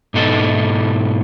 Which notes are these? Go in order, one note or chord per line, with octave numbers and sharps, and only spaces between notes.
G#2 B2 D#4 A4